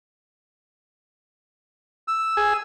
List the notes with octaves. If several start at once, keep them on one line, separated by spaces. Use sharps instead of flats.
E6
G#4